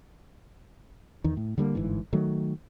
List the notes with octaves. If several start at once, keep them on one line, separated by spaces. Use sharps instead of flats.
E2 D#3
A2
D3 G3 A3 A#3
G1 G#2 E3
D#3 F#3 A3